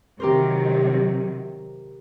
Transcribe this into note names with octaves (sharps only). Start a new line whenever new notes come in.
C3 D#3 F#3 G4 A#4 C5